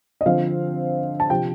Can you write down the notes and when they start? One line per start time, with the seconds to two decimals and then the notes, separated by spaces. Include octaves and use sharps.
0.21 D#5
0.26 D3 F3 C4 F5
1.20 A5
1.30 C3 F3 G5